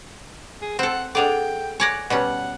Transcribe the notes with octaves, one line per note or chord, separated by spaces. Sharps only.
G#4
C4 A4 F#5
D4 G#4 A4 D5 F#5 G5 F7
C#5 D5 F#5 G#5 G#6 A#6
B2 G3 C#4 F#5